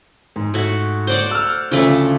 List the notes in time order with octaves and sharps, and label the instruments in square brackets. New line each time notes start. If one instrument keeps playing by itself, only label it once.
[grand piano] G#2
[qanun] A3 F#4
C5 D5 F#5
[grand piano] E6 F6
[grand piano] D2 C#3 [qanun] F3 A3 D4